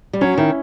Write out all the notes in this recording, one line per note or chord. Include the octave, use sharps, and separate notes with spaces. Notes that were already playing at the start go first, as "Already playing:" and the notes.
G3
F#3 C#4
D#3 E4